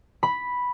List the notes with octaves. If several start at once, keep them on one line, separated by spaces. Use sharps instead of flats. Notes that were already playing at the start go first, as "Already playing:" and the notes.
B5